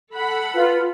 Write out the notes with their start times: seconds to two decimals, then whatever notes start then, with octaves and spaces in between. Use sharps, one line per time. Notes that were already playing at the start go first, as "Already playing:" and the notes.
0.15 A4 F#5 B5
0.54 F4 B4